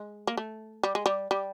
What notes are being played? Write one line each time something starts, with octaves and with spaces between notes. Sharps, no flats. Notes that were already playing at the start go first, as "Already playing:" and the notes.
Already playing: G#3
A#3
A3
G3
G#3
G3
G3